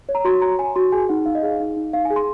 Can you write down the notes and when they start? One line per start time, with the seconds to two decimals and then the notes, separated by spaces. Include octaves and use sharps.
0.09 C#5
0.15 A#5
0.25 F#4 C6
0.42 C#5 A#5
0.59 C#5 G#5
0.76 F#4 C6
0.92 G#4 G#5
1.09 D#4 F#5
1.26 D#4 F5
1.35 D#5
1.43 G#4 F5
1.60 D#4
1.77 D#4
1.93 D#4 F5
2.05 G#5
2.10 G#4
2.16 C6